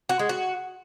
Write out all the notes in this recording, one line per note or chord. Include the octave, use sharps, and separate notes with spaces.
F#4
G#3
F#4